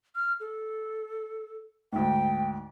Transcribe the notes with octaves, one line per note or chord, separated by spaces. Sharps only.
F6
A4
D2 G#2 G5